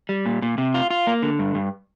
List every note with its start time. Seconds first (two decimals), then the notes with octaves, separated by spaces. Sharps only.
0.09 G3
0.26 A#2
0.42 A#2
0.58 C3
0.74 F4
0.90 F4
1.07 A#3
1.22 D3
1.39 G2
1.55 G2